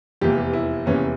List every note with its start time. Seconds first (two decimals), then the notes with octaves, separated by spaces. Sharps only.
0.21 F1 E2 E3 A#3 G4
0.53 E4
0.86 F1 E2 E3 A#3 C#4